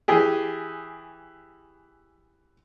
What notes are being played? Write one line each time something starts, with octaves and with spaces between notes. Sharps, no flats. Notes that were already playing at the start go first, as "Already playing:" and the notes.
E3 G4 G#4